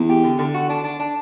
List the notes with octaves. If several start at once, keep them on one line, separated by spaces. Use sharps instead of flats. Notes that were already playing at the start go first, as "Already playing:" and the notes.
Already playing: E2
G4
D3
D3
F#4
D4
D4
D4